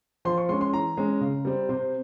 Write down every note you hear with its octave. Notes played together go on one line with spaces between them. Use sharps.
F3 C6
C#6
G#3 C#4 C6
C6
E3 A#5
G#3 C#4
C#3
G3 C4
C3 C5